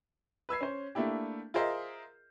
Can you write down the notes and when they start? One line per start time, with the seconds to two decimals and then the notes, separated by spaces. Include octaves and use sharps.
0.49 B4 E6 G#6 C7
0.61 C#4 C5
0.95 A3 A#3 D4 E4 G4
1.54 F4 G#4 A#4 C5 D#5 E5